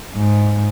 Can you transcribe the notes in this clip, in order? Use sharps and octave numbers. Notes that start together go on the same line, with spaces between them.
G#2